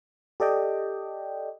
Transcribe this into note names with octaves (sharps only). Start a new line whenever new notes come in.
G4 A4 D5 D#5 G5